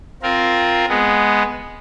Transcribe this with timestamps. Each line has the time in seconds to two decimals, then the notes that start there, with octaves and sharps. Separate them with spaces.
0.23 C4 F4 A#4
0.89 G#3 B3